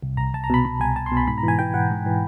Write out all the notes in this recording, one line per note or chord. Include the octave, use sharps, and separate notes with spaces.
C2
C2 A#5
C2 A5
A#5
B2 B5
B2 B5
C2 G#5
C2 A5
C6
B2
B5
G#2 B5
A#5
E3
G#5
E3 G5
E3 F#5
G#2
E3